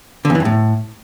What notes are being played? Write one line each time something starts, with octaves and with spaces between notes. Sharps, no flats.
D3
E2
E3
F2
A2